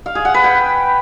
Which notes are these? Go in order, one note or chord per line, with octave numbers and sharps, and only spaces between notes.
F5
G#4
F#5
B4
G5